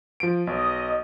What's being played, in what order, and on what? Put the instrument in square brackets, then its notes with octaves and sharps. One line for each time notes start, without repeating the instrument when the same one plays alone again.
[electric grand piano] F3 D7
[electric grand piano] B1 [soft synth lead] D#5